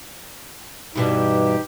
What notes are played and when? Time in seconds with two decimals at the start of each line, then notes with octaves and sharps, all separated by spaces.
0.95 G2 B2 E3 D#4 G4